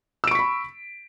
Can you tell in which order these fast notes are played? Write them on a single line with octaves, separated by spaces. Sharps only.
E6 D7 C#6 B6 B5